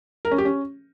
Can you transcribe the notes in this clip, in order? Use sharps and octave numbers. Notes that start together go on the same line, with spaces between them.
A#4
C#4
G4
C#4